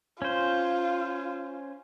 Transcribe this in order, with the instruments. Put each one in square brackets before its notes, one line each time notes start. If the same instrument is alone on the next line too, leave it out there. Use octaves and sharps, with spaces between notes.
[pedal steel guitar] C#4 C5 [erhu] F4